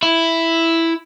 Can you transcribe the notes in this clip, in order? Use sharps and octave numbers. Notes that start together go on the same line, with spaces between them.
E4